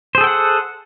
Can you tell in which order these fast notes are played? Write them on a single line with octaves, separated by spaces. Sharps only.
C5 G#4 A4 G5 F#5